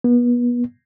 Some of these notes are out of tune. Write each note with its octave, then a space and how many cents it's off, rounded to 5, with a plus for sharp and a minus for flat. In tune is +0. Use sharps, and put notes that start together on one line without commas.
B3 -30